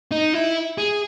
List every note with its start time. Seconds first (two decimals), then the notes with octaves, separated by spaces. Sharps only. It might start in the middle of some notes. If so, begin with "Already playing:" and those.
0.11 D#4
0.34 E4
0.78 G#4